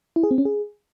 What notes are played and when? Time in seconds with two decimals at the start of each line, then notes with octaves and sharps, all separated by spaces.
0.16 E4
0.23 G#4
0.31 C4
0.38 C#4
0.45 G#4